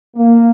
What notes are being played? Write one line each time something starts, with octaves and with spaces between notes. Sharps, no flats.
A#3